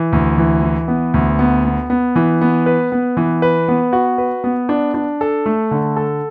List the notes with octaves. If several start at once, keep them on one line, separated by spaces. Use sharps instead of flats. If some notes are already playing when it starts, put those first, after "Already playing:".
Already playing: E3
D2
E3
E3
B3
D2
B3
B3
B3
E3
B3
B4
B3
E3
B4
B3
F#4
B4
B3
D4
D4
A4
A3
D3
A4